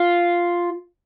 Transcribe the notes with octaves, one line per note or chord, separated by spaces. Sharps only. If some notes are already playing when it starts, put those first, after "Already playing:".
Already playing: F4